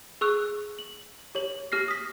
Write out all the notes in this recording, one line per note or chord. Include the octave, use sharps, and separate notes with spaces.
G#4 C#6 E6 F#6
F#7
G4 C#5 F#7
G4 F6 A#6 C7
D#6 B6